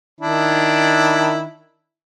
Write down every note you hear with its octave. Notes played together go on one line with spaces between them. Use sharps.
D#3 D4 E4